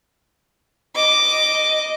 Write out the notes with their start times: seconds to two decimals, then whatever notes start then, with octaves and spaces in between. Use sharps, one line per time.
0.96 D#5 D6